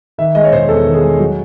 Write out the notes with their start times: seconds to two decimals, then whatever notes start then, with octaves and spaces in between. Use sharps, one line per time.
0.18 D#3 E5
0.35 G#3 D#5
0.44 C#5
0.52 E1 C5
0.69 E2 A4
0.86 D#3
0.94 G#4
1.03 G#3
1.19 F#3 F#4